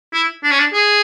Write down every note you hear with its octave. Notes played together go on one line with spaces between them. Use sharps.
E4
D4
C#4
D4
G#4